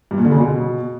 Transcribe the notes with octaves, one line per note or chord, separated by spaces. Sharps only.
G2
A#2
D3
C#3
B2